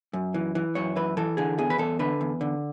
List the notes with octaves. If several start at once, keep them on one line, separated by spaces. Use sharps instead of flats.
F#2
E3
E3
F#2 C#5
E3 B4
E3 A4
D3 G#4
E2 G#4
B4
E2 A4
D3 B4
E2
D3